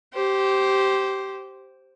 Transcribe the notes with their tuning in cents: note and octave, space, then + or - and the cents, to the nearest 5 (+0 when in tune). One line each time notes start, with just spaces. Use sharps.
G4 -15 C5 +0